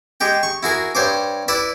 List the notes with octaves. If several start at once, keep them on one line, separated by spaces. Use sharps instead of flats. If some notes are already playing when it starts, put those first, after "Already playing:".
G#3 G4 G5
C#6
E4 F#4 G#4 A#4
G2 C5 C#5 D6
E4 B4 D5 E5